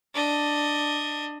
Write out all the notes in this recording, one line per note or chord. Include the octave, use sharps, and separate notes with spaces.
D4 D#5